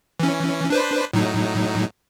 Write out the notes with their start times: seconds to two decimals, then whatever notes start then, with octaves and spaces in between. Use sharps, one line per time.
0.20 E3 C#4
0.70 D4 B4 C5
1.13 A2 F#3 D#4